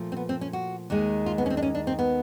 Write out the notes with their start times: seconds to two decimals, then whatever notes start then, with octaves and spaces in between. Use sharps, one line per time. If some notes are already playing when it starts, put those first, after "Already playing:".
Already playing: A#2 F3 A3
0.12 C4
0.17 B3
0.29 C4
0.41 C#4
0.53 F#4
0.90 D#2 D#3 G#3
1.26 F4
1.38 B3
1.46 C#4
1.50 C4
1.57 D4
1.62 C#4
1.75 D4
1.87 C4
1.99 B3